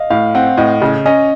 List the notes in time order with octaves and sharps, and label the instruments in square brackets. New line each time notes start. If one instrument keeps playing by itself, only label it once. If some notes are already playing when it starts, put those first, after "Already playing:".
Already playing: [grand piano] D#5 F5
[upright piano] A2 [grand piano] F5
[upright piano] C4 [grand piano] F#5
[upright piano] A2 [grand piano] D#5
[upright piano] C#3 [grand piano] D#5
[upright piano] C#4 [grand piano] D#5